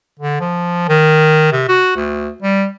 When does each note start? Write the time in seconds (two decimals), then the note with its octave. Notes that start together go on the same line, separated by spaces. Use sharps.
0.20 D3
0.40 F3
0.89 D#3
1.52 C3
1.69 F#4
1.96 D2
2.42 G3